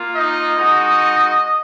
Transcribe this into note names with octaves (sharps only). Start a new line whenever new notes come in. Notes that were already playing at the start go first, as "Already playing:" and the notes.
Already playing: A#3 F4
D#4 D#5
G#3 D#4 F#4